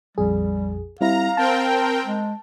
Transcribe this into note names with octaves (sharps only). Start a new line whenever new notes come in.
A#1 F2 G3 G#4
G3 C4 E4 F5 A#5
C4 A#4 G5 A5
G#3